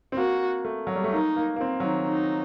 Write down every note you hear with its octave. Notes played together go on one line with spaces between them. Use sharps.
C4
A#3 F#4
A3
F#3
G3
A3
A#3 D#4
A#3
A#3
C4
F#3
D#3
D#4